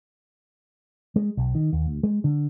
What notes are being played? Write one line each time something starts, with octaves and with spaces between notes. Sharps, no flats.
G#3
B1
D#3
D#2
D2
G#3
D3